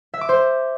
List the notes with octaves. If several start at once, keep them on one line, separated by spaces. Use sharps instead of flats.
E5
D6
C5